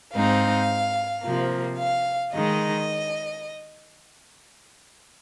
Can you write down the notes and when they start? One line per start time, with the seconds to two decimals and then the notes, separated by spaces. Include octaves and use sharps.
0.14 G#2 G#3 C4 D#4 F5
1.24 C3 F3 A#3
1.78 F5
2.33 D#3 G#3 D#4 D#5